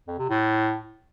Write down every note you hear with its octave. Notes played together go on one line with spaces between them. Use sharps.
F2
C3
A2